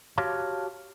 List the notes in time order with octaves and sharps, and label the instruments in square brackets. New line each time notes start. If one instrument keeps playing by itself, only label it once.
[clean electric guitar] F#4 G4 C#5 F5 A5 C6